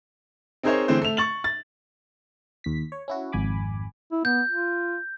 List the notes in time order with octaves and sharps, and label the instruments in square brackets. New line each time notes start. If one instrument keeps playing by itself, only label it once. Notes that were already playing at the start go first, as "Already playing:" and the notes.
[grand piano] C4 D#4 G#4 A#4 C5 C#5
D3 E3 A3 C4 G#4 C5
A3 F7
C#6 A6 F#7
A6
[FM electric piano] D#2 B6
C#5
C#4 E4 F#4
G#1 F2 G#5 B5 D6
[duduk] E4
[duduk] B3 [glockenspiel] G6
[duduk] F4